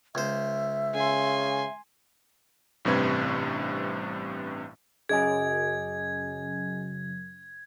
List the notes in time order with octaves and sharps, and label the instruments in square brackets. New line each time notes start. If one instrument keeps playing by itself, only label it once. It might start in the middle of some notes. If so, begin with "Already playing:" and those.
[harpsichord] C#2 C5 [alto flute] E5
[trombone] C#3 [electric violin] G#5 C6
[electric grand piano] A1 G2 C3 B4 G#6
[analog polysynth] F#2 C#3 [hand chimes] G#4 D#5 G#5 [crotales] G#6